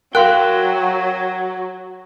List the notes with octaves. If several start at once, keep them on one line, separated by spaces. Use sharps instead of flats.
F#3 F#4 A#4 F5 G5 C6 F#6